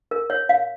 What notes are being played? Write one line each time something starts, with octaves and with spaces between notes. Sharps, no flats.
A#4
C#5
F5